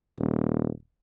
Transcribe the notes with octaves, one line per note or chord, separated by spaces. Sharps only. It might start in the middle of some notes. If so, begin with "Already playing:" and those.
D#1